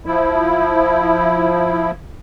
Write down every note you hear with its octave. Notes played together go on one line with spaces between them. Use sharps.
F3 E4